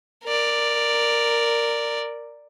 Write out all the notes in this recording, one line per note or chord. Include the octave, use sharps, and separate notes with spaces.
A#4 D5